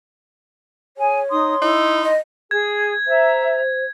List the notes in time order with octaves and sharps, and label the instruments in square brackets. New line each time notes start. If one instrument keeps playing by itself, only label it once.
[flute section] G#4 G#5 [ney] C#5
[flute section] D#4 D#6 [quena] C6
[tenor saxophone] D#4 [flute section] E4
[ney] D#5
[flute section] G#4 [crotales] G#6
[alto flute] C5 [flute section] E5 A#5